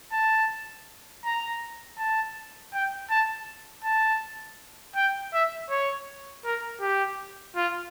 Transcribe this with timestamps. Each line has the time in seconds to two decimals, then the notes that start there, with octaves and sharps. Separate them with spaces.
0.12 A5
1.25 A#5
1.98 A5
2.73 G5
3.10 A5
3.84 A5
4.96 G5
5.33 E5
5.70 C#5
6.45 A#4
6.81 G4
7.56 F4